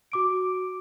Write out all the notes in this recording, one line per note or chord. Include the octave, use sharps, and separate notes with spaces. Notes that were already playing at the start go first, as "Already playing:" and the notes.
F#4 D6 D7